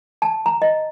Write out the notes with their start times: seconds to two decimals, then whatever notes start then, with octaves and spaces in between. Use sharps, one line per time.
0.22 A5
0.46 A#5
0.62 D#5